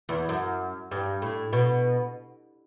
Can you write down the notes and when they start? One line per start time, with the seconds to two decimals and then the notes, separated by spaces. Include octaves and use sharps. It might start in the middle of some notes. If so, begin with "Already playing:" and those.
0.09 E2
0.29 F#2
0.91 G2
1.22 A2
1.53 B2